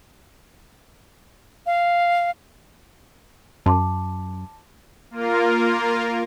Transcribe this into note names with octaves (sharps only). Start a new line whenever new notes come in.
F5
F#2 A5 C6 D6
A#3 F4 A#4